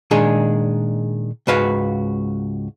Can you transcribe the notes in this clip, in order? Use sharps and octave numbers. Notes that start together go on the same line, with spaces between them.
A#2 D#3 G#3 D4 G#4
C#2 G#2 F#4 B4 F5